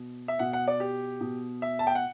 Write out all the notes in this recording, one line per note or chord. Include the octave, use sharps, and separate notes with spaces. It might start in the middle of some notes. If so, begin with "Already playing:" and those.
Already playing: B2
E5
B2 F#5
F#5
D5
G4
B2
E5
A5
G5
F#5